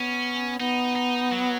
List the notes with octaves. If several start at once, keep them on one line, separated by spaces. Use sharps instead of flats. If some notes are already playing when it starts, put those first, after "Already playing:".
Already playing: B3 C#4
B3 D#4
D#4
F#3